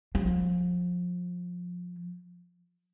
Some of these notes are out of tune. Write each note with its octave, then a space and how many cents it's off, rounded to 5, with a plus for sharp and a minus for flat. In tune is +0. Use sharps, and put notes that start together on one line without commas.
F3 +25